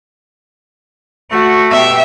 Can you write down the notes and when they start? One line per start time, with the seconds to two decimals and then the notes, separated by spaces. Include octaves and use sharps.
1.32 A3 F#4
1.72 B2 G4 E5